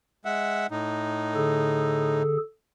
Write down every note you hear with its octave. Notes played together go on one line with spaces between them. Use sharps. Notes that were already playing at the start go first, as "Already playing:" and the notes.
G#3 E5 F#5
A2 D#4
D3 G#4 A4